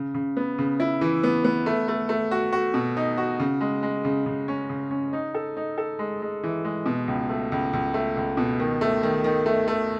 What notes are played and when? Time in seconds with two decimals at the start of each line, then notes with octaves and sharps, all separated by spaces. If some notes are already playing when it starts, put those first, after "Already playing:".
Already playing: C#3
0.14 C#3
0.37 B3
0.58 C#3
0.80 E4
1.01 E3
1.23 B3
1.44 B3
1.66 A3
1.88 A3
2.09 A3
2.31 F#4
2.53 F#4
2.74 B2
2.97 D#4
3.18 F#4
3.40 C#3
3.61 G#3
3.83 G#3
4.05 C#3
4.26 C#3
4.48 C#4
4.69 C#3
4.91 C#4
5.13 D#4
5.34 A4
5.57 D#4
5.78 A4
5.99 G#3
6.22 G#3
6.43 E3
6.65 G#3
6.86 B2
7.08 C#2
7.29 A3
7.52 C#2
7.73 C#2
7.94 A3
8.17 C#2
8.37 B2
8.60 D#3
8.81 A3
9.03 D#3
9.24 D#3
9.46 A3
9.68 A3